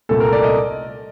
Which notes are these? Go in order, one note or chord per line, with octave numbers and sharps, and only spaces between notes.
C2 A#2 A3 A4
A#4
D5
D#5